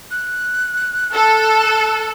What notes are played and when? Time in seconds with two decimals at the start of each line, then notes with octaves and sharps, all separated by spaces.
0.11 F#6
1.14 A4